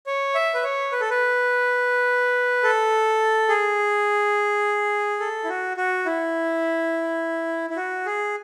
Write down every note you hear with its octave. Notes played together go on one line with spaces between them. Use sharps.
C#5
E5
B4
C#5
B4
A4
B4
A4
G#4
A4
E4
F#4
F#4
E4
E4
F#4
G#4